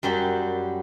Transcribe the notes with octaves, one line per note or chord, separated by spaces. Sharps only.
F#2 F#3 G3 G4